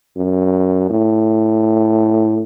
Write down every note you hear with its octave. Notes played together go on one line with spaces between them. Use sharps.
F#2
A2